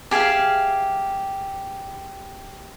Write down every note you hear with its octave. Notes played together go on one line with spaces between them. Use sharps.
G4 G#4 E5 F5